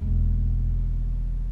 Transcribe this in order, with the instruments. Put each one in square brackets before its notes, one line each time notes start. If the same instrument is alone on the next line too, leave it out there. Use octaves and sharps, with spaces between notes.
[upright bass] E1 D#2